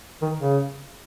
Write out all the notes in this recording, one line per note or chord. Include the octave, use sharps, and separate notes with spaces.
D#3
C#3